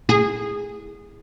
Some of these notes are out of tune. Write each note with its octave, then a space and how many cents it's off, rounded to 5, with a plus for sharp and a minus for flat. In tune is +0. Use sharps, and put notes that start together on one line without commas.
G#4 -20